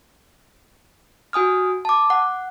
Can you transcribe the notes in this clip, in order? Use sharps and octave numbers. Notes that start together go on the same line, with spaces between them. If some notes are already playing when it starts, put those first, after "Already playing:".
F#4 G#5 D#6 F6
A5 D6
F#5